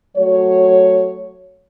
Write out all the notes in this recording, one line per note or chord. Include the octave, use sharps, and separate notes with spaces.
F#3 A3 F#4 C#5